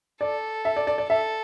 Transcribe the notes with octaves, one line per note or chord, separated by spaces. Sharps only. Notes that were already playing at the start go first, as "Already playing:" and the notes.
A4 D5
E5
D5
D5
D5
A4 E5